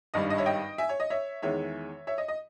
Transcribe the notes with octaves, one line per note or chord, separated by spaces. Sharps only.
G#1 G2 G3 D#5
D#5
C#5 E5
D#5 G5
E5 G#5
C#5
D#5
C#5 E5
E2 D#3 G#3 C#5 E5
C#5 E5
D#5
D#5